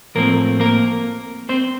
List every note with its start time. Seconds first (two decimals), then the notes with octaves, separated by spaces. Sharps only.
0.15 A2 F3 A3 A#3 C4 A#4
0.60 A#3 A#4
1.49 C4 C5